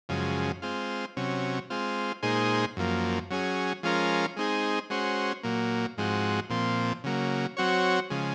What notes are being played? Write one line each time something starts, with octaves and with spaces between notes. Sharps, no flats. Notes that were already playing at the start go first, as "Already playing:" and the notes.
F#2 C#3 F3 G#3
G#3 C4 F4
C3 F#3 C#4
G#3 C4 F4
A#2 G#3 D#4 G#4 C5
F#2 F3 A#3
F#3 C#4 G#4
F3 G#3 C#4 F4 A#4
G#3 C4 D#4 G#4
G#3 C#4 F#4 C5
A#2 F#3 A#3
G#2 F3 G#3 C4 F#4
A#2 F3 C4
C#3 F#3 A#3
F#3 C4 F#4 C#5
C#3 F3 G#3